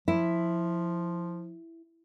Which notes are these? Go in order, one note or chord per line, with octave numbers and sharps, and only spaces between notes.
F3 E4